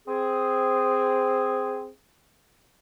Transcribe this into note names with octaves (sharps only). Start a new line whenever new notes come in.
C4 G#4